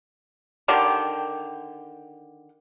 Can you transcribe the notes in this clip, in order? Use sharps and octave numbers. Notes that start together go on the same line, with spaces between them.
D3 D#3 G4